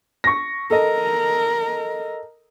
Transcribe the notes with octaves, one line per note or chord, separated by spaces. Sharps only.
C#6 A#6
A4 A#4 D#5